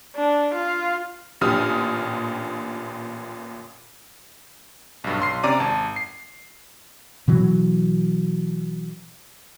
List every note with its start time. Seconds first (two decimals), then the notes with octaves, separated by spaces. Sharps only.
0.16 D4
0.54 F4
1.41 A1 A#2 D3 G4 D#6 F6
5.04 B1 G2
5.20 B1 C6 C7
5.43 C3 C#4 D5 A#5 D6 D#7
5.60 G#1 A5
5.96 C7
7.28 B2 E3 F#3